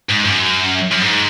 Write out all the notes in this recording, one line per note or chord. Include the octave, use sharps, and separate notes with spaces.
G#2
F#2
F#2
G#2